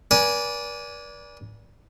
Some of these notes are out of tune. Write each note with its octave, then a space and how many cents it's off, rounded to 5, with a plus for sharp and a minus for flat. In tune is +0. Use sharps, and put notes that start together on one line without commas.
B4 -45 D5 -20 G#5 +0